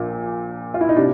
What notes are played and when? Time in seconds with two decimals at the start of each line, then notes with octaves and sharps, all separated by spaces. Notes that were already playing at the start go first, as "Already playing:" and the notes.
Already playing: A#1 A#2
0.74 F4
0.81 E4
0.89 D#4
0.96 C3 D4